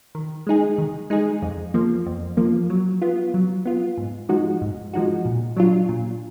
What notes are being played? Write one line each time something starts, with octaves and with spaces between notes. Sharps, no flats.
D#3
G#3 D#4 G#4
D#3
G#3 D#4 G#4
F2
F3 A#3
F2
F3 A#3
F#3
B3 F4
F#3
B3 F4
G#2
F3 G#3 D#4 F#4
G#2
F3 G#3 D#4 F#4
A#2
F#3 D4 F4
A#2